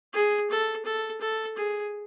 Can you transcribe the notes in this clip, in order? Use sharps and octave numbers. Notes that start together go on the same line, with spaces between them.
G#4
A4
A4
A4
G#4